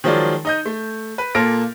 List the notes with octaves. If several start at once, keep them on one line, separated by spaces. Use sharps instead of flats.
D#3 F3 F#3 G#3 F4 D5
D#4 D#5 G6
A3
B4
A#2 A#3 A4 F6 A#6 D7